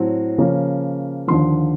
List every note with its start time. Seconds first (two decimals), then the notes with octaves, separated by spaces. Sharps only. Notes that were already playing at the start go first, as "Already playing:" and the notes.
Already playing: A2 F#3 C4
0.38 C#3 F3 A#3 C#4
1.27 D#2 D3 F3 C6